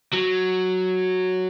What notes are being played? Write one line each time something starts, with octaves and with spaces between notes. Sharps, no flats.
F#3